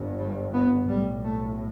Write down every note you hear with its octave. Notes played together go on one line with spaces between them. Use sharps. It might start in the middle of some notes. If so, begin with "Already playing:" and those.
Already playing: G1 G2
G3
B3
B1 A2 G3
A3